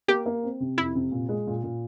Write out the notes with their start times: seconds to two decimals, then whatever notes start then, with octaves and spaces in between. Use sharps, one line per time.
0.08 A#3 G4
0.26 A#3
0.43 C4
0.60 C3
0.77 F2 E4
0.95 C3
1.12 A#2
1.29 G#3
1.47 A#2
1.64 A#2